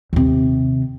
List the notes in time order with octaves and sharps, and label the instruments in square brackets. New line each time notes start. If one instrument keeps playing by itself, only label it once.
[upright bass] D#2 C3